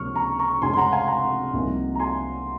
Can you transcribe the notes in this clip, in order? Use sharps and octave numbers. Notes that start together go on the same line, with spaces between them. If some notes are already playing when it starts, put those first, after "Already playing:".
Already playing: C#2 C3 F3 A#3 C#4 C#6 F6
A#5 C#6
A#5 C#6
F1 F2 C#3 G#3 C#4 G#5 C6
C6
F#5 A#5
F5 G#5
F#5 A#5
C2 C3 F3 A#3 D#4
A#5
G#5 C6